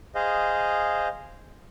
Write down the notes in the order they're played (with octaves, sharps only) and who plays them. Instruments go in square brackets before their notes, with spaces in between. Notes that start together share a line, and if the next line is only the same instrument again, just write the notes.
[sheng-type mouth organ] G#4 C5 D#5 F5